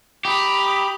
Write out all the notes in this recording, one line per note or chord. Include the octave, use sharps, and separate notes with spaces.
G4 A#5 B5 D#6